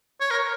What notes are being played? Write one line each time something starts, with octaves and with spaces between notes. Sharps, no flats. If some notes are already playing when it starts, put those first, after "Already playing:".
C#5
A#4